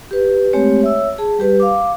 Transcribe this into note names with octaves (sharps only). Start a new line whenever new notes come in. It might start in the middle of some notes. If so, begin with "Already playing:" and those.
G4 B4
G#3 A3 C4 G4 C#5
C#5 E5 E6
G#4 A5
G3 G4 B4
F5 D6